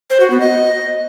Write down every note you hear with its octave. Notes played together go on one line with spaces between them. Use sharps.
C5
F#4
B3
D#5